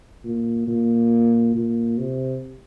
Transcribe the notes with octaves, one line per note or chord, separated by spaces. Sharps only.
A#2
A#2
A#2
C3